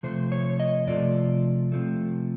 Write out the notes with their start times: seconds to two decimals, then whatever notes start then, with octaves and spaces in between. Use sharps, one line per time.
0.03 C3 F3 A3 C5
0.32 C#5
0.60 D#5
0.87 C3 F3 A3 D5
1.72 C3 F3 A3